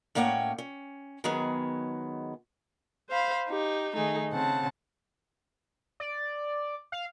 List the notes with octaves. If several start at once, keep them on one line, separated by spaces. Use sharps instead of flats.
A2 A#3 C#4 C#5 F#5 G5
C#4
D#3 F#3 G#3 B3 G#4
C5 F5 B5
D#4 G4
D#3 A3 D#4 G#4
C#3 C4 F#5 A5
D5
F5